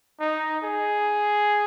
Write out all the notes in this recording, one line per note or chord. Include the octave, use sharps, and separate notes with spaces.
D#4
G#4